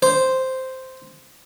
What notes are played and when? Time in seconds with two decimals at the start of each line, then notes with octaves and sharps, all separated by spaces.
0.02 C5